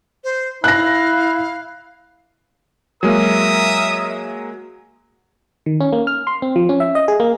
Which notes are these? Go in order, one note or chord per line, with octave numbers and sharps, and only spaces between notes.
C5
E4 F5 F#6 A#6
F#3 G#3 A#3 A#4 E5 D#6
D#3
C#4
A#3
F6
C6
C4
F3
C#4
E5
D#5
G#4
A#3